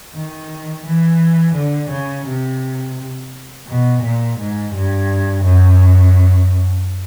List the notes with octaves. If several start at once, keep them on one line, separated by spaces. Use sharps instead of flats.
D#3
E3
D3
C#3
C3
B2
A#2
G#2
G2
F#2